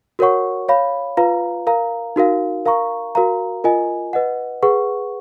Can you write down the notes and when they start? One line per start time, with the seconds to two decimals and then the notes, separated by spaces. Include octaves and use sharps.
0.19 F#4 A#4 C#5 F#5 C#6
0.69 C#5 F5 B5
1.17 F4 B4 F5 A#5
1.67 A#4 F5 A#5
2.16 D#4 F#4 A#4 F5
2.66 A#4 F5 A#5 C#6
3.15 F#4 A#4 F5 A#5
3.64 F4 A#4 D#5 G#5
4.13 B4 D#5 F#5
4.63 G#4 B4 F#5 C#6